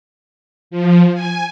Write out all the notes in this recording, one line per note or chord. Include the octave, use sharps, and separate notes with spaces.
F3
G#5